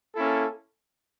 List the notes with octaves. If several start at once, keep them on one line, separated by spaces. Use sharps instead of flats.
A#3 C#4 E4 A4